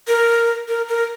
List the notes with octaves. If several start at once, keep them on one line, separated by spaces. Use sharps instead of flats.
A#4
A#4
A#4